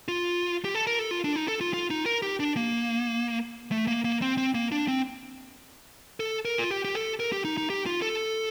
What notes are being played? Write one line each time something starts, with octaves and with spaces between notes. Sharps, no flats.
F4
G4
A4
A#4
A4
F4
D4
D#4
A4
F4
F4
D#4
A#4
G4
D4
A#3
A3
A#3
A#3
C4
C4
A#3
D4
C4
A4
A#4
F4
G4
G4
A4
A#4
G4
D#4
D#4
G4
F4
A4